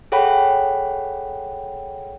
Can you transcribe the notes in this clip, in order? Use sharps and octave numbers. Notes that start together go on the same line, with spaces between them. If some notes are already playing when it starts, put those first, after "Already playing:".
G#4 A4 C#5 F#5 G5 B5